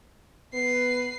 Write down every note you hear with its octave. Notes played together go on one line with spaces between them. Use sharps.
B3 B4 C7